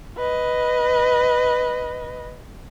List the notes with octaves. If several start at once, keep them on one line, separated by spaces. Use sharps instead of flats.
B4 D#5